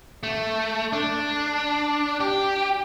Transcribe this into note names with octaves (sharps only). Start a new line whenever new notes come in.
A3
D4
G4